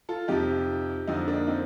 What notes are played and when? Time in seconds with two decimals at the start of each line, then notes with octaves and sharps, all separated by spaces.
0.09 F4 A4
0.28 F2 C3 F3 D#4 G4
1.08 F2 D3 F3 C4 D#4
1.27 A#3 D4
1.47 C4 D#4